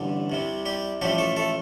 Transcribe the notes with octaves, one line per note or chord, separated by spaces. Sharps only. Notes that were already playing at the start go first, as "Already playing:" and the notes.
Already playing: A1 G2 D3 G3
C2 C3 G3
G3 G4
A1 A2 F3 G3 A3 G4
A3 A4
A3 A4